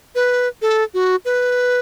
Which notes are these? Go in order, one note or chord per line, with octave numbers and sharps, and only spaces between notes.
B4
A4
F#4
B4